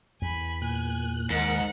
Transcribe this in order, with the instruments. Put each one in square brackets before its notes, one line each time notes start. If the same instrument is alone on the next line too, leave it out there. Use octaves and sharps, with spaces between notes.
[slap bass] E2 [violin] G#5 B5
[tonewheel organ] A#2 F#6 [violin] G#5
[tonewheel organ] D#2 A#4 [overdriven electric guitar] G#2 [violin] F#5